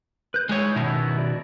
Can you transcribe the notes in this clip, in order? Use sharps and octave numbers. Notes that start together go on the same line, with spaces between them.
B4 G6
G#3 D#4 E4 G#4 C#5
B2 D#3 B3 E4
F#4 D5